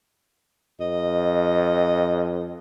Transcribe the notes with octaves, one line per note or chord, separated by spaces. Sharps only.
F2 D#5